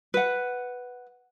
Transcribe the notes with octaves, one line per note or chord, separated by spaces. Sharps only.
B4 F#5